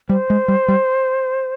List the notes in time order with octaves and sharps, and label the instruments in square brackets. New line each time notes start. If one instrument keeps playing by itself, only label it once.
[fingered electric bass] G3 [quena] C5
[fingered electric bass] G#3
G3
G3